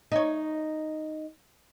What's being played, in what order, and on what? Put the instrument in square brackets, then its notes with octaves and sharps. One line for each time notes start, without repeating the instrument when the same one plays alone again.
[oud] D#4 C#5